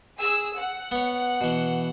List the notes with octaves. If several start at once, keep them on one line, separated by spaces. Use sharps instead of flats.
G#4 E6
F#5
B3 C#5
B2 E3